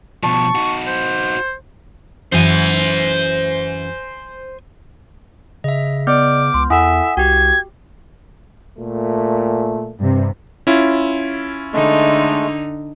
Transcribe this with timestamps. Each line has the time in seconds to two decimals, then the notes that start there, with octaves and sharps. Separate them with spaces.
0.23 B2 F3 A5 C#6
0.55 D#4 F#4
0.87 C5
2.32 F#2 E3 C5 G#5
5.64 C#3 D#5 E5
6.07 B3 D5 D#5 D6 F6 G6
6.54 C#2 C6
6.70 E2 E4 A4 E5 F#5 G#5 D#6
7.17 C2 F#4 G4 G5 G#6
8.78 A#2 A3
9.99 G2 C3
10.67 C#4 E4 F4
11.73 D3 G#3 A3 D#4